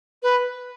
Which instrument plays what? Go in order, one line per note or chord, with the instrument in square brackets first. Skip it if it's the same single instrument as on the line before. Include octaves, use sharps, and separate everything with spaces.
[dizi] B4